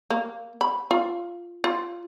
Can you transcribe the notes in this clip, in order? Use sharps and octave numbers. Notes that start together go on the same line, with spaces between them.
A#3
B5
F4
F4